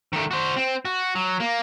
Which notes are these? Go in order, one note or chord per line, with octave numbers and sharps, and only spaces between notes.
D#3 A3
F#4 C5
C4
F#4
F#3
A#3